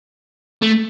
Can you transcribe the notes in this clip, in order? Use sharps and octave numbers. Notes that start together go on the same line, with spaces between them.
A3